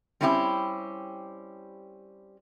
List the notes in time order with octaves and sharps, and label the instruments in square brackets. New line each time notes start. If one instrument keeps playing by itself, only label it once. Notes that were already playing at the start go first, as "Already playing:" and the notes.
[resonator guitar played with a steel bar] G3 C4 C#4 E4 F#4 G4